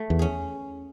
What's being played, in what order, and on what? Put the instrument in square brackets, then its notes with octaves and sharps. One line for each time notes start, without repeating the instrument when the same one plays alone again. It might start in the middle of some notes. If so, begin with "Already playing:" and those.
Already playing: [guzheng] A3
[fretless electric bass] E2
[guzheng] C#4 G#4